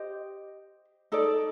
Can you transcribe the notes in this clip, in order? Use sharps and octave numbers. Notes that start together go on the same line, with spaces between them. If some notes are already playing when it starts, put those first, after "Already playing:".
Already playing: G4 C5 D#5
D#4 A4 D5